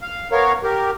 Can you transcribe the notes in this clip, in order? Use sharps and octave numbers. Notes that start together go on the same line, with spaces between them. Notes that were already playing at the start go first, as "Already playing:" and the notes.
F5
B3 A#4 C#5 F5
G4 A#4